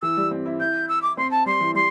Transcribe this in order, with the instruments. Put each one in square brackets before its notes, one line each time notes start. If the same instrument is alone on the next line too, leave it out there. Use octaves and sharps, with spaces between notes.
[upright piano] E3 [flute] E6
[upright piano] G3
C4
E4
[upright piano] E4 [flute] G6
[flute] E6
D6
[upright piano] C4 [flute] C6
[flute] A5
[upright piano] G3 [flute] C6
[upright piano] E3
[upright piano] G3 [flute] C6